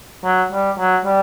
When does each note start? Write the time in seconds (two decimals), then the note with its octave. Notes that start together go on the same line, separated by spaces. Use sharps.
0.24 F#3
0.52 G3
0.79 F#3
1.05 G3